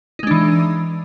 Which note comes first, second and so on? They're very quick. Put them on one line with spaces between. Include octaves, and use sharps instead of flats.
D#4 G#3 D4 E3